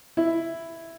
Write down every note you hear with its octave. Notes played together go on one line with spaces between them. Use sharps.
E4